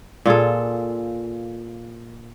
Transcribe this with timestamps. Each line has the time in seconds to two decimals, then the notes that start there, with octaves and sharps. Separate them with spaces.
0.25 A#2 F4 G#4 A4